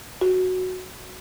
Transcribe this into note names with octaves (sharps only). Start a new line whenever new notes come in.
F#4